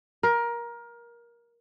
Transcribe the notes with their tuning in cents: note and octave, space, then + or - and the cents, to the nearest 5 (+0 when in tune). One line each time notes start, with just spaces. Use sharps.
A#4 +20